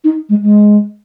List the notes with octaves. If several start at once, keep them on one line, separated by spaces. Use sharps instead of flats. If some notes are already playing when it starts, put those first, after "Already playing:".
D#4
G#3
G#3